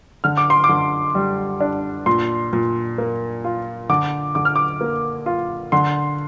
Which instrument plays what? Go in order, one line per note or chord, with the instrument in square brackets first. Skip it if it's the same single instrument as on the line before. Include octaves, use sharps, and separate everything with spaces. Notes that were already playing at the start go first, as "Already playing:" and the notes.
[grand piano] D3 F6
D6
C6
D6
D3
G3
D4
A#2 C6
A#2
A#3
F4
D3 D6
D3 D6
F6
D6
A#3
F4
D3 C6